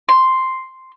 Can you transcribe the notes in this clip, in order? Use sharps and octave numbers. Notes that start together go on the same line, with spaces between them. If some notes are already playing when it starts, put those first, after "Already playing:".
C6